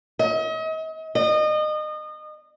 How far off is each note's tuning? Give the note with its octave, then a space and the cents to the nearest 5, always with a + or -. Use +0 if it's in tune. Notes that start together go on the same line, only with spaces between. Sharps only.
D#5 +40
D#5 -30